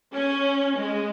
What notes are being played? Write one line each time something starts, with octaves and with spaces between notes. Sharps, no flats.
C#4
G#3